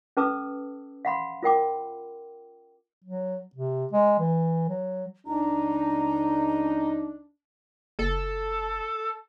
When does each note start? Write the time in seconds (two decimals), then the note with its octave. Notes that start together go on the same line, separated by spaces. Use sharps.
0.17 C#4 A4 B4 A5 D6 E6
1.05 F5 F#5 B5 C6
1.43 F4 A#4 G5 D6
3.04 F#3
3.55 C3
3.93 G#3
4.19 E3
4.69 F#3
5.27 C#2 D4 D#4 A#5
7.99 F#1 A4